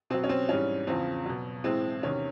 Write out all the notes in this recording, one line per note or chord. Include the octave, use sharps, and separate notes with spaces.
B2 F#3 C4
C#4
C4
G#2 E3 G3 C#4
E2 C#3 F3 C4
B2 F#3
A2 E3 G#3 C4
E2 C3 D#3 C#4